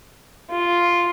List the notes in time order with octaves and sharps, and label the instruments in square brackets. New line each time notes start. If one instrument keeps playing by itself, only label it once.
[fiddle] F4